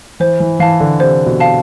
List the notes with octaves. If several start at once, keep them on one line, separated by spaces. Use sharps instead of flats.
E3 C5
E3
E3 F5 A5
D3
C3 C5
B2
F5 A5